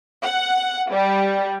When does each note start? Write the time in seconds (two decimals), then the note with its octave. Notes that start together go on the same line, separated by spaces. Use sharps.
0.23 F#5
0.91 G3